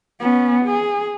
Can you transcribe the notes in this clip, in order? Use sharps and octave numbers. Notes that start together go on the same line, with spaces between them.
B3 C#4
G#4